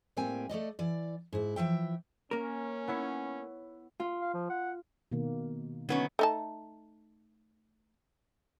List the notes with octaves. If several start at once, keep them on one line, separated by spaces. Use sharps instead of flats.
A2 G3 A#3 C4 G5 G#5
A3 A4 D5 D#5
E3 D5
G#2 E4
E3 F3 E5 G5
A#3 C#4 A#4
B3 E4 C#5
F4
F5
F3
F#5
B2 D#3 A#3
D3 F#3 B3 C#4 D#4
A3 D#4 A5